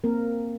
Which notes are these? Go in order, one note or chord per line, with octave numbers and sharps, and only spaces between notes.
A#3 C4 A#4